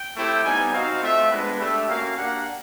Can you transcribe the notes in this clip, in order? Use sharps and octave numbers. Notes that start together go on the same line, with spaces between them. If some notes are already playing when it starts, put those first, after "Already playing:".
Already playing: G5
A3 C4 E4 G4
G3 B3 D#4 G#5
C4 D#4 F#4 F5
A3 C4 F4 E5
G#3 B3 D4 B4
A3 D4 G4 E5
A#3 C#4 F#4 F5
A#3 D4 G4 F#5